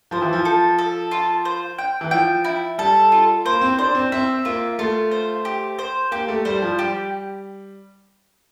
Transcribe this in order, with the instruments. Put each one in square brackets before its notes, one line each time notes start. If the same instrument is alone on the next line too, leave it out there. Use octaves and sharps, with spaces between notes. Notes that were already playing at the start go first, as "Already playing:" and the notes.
[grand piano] F3 [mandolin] C5
[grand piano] E3
F3
[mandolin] A4
A4
F4
C5
G5
[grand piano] E3
[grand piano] F3 [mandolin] G5
[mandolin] E4
[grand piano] G3 [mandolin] A4
[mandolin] F4
[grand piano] A#3 [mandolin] C5
[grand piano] C4
[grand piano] D4 [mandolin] C5
[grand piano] C4
[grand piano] C4 [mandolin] E5
[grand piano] A#3 [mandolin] F4
[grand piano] A3 [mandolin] F4
[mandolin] C5
G4
C5
[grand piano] A#3 [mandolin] G4
[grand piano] A3
[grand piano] G3 [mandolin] C5
[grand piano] F3
[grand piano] G3 [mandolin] G4